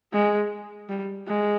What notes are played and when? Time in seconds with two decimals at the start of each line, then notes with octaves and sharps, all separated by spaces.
0.13 G#3
0.89 G3
1.28 G#3